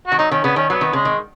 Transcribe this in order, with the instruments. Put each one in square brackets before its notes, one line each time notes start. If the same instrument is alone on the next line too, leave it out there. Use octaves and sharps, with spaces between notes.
[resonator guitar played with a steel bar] D#3 [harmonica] F#4
[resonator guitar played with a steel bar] F#3 [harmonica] D#4
[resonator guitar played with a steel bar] D#3 [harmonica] C#4
[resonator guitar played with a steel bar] C#3 [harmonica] B3
[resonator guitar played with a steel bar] D#3 [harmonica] C#4
[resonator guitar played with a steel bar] F#3 [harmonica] B3
[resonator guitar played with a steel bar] D#3
[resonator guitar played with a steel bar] C#3 [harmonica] G#3
[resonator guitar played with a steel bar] D#3